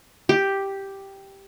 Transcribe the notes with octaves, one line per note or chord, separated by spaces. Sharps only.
G4